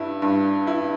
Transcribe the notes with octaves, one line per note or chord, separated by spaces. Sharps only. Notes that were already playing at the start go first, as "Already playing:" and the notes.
Already playing: G2 E4
G2
E4